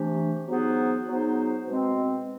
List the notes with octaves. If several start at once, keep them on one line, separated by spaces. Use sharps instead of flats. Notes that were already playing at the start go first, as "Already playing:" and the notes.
Already playing: C3 E3 A3 D4 G4
F#3 B3 D#4 G#4 C5
F#3 B3 D#4 G#4 C5
B2 G#3 C4